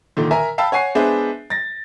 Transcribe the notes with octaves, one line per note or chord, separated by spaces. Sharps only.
A#2 D3 D#3
A#4 E5 G#5 A#5
F5 G5 A5 B5 E6
C#5 F#5 G#5 C#6 C7
G#3 B3 D4 G#4 C5 E5
A6 A#6